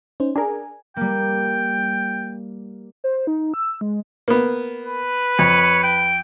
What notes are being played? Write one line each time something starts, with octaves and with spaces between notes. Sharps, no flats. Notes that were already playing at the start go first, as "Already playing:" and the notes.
C#4 D#4 C5
D4 G#4 A#4 G#5
G3 A#3 G5
C5
D#4
E6
G#3
A#3 B3
B4
F2 C#5
G5